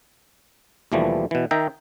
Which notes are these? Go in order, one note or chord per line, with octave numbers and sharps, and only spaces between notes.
D#2 B2 E3 F3 G3 A3
B2 E3
D#3 D#4 E5 G5 A#5